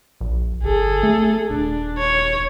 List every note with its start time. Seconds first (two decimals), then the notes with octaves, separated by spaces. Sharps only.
0.21 A#1
0.63 G1 G#4 A4
1.03 A3
1.49 D#1 D4
1.99 C#5